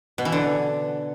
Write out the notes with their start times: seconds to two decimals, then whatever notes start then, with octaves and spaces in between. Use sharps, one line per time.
0.18 B2
0.25 E3
0.32 D3